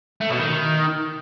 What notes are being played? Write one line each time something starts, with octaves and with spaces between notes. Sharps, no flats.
A3
B2
D#3